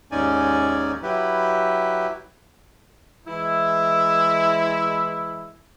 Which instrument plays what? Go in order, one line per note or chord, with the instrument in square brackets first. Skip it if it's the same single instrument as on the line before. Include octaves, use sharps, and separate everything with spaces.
[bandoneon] D#2 G#2 C#4 D#4 D5 G#5
F#3 E4 G4 B4
[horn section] E3 G#3 E4